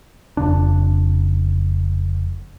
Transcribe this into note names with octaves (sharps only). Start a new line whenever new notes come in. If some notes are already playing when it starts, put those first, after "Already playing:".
F1 F2 C#3 D4